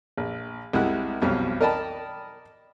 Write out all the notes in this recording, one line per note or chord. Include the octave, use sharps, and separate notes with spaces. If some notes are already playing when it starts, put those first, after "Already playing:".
A#1
C2 G3 G#3 E4 F#5 F#6
B1 F2 F#3 G3 F6
A#4 D5 D#5 G5 A5 B5